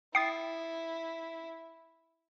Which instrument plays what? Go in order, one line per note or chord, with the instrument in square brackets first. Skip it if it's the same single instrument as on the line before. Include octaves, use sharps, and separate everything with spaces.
[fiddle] E4 [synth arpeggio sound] G5 D#6 A6 [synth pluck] C7